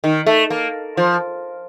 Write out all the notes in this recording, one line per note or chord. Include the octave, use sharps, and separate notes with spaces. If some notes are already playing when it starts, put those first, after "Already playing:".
D#3
A3
A#3
F3